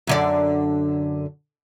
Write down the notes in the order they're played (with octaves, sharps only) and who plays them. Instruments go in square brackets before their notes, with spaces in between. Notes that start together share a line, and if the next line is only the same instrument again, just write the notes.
[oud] F#2 D3 D5